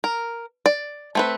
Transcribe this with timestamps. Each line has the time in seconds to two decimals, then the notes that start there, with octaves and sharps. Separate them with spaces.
0.04 A#4
0.66 D5
1.15 A3 C4 B4